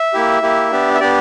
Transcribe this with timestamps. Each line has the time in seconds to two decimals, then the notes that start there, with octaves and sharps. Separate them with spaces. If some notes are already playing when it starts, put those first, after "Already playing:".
Already playing: E5
0.13 A#3 E4 G4
0.42 A#3 E4 G4
0.71 B3 D4 G4
0.95 E5
1.00 B3 D4 G4 D5